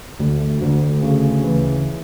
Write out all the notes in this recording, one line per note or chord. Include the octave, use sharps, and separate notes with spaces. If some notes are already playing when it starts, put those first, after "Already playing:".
D2
D2
C#3
E3